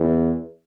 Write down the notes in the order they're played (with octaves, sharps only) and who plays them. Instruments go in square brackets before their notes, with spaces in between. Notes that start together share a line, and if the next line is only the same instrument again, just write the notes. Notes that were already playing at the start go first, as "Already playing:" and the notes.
Already playing: [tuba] E2